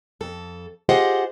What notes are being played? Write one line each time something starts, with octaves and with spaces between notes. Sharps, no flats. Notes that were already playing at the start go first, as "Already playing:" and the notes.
F2 A4
F4 G4 G#4 C5 D#5 F#5